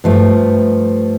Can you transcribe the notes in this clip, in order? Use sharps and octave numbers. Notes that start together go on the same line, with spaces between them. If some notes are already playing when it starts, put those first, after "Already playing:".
G2 F3 A3